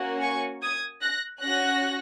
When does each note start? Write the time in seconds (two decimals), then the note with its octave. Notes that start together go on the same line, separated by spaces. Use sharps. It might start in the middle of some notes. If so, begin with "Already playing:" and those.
Already playing: A#3 C#4 F#4
0.20 G#5 C#6
0.61 D#6 G#6
1.01 F#6 A#6
1.42 C#4 F#4 F#6 A#6